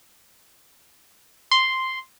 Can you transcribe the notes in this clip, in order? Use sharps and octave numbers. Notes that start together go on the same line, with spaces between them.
C6